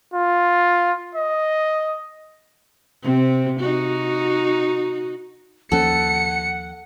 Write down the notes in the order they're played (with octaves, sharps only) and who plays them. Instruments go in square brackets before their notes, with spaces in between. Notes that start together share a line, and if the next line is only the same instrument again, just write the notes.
[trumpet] F4
D#5
[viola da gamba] C3 C4
D#4 F#4
[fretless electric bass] D#2 F3 C#4 [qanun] A4 [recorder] F#5 [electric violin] C#7